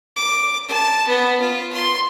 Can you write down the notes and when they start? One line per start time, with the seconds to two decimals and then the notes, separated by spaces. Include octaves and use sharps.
0.16 D6
0.68 A5
1.07 B3
1.40 F4
1.73 C6